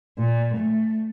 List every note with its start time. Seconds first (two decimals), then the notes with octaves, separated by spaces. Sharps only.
0.19 A#2
0.57 A3